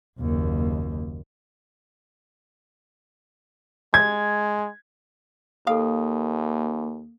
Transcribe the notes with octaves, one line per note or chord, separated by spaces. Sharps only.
F#1 D#2
G#3 G#6
D#2 A#3 A4 F5 D#6